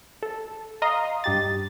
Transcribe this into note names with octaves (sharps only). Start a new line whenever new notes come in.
A4
D#5 F5 A#5 C6 D#6
G2 G4 A6